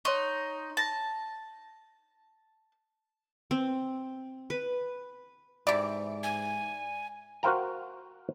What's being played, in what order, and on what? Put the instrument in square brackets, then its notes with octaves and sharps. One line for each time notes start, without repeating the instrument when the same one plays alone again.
[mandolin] D#4 [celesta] C#5 C6 C#6
[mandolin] A5 [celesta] A6 A#6
[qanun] C4
B4
[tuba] G#2 [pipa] C3 E3 [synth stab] D5
[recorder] G#5
[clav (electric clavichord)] F#4 A#4 C5 F5 G5 A#5